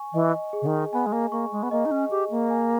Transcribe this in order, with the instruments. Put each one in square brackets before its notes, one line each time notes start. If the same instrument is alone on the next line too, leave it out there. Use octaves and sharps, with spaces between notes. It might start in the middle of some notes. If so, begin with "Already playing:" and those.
Already playing: [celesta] G#5 C#6
[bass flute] E3 [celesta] D#5
[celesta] G#4
[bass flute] C#3
D#3
[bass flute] B3 [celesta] G#5
[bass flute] G#3
A#3
[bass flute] A#3 [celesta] C#6
[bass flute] G#3
B3
[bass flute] A#3 [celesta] D#5
[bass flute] D#4
C#4
[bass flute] G4 [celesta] G#4
[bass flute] A#3
[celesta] G#5